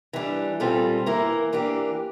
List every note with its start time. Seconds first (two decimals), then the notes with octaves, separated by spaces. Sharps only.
0.13 E3 G3 D4
0.60 A#2 G3 C4 F4 A4
1.06 E3 A#3 E4 A#4
1.53 E3 A#3 D4 G4